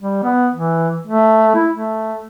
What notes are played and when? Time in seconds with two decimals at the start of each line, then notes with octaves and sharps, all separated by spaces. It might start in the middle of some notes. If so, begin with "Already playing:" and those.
0.01 G3
0.23 B3
0.53 E3
1.07 A3
1.55 E4
1.74 A3